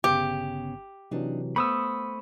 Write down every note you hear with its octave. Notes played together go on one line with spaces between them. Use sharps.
G1 C#3 B3 G4
C3 E3 F#3 D4 D#4
A3 B3 C5 B5 C#6 D#6 E6